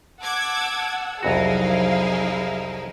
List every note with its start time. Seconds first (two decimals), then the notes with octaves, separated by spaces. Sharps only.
0.21 F#5 A5 D6 E6 G#6
1.23 C2 F2 F#3 D#4 E4 F#4 G#4 F5